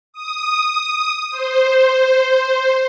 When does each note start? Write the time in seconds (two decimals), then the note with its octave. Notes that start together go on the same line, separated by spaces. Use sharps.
0.13 D#6
1.31 C5